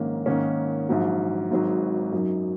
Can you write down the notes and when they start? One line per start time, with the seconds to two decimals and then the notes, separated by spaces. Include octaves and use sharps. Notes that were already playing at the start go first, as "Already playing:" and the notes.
Already playing: A#1 G#2 D#3 A#3 C#4
0.26 G#2 D#3 A#3 C#4
0.89 A#1 G#2 F#3
1.51 G#1 G#2 F#3
2.12 F#2 F#3 D#4